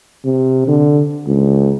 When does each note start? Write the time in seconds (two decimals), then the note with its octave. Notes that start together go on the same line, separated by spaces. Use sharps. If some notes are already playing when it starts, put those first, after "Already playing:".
0.25 C3
0.67 D3
1.27 C#2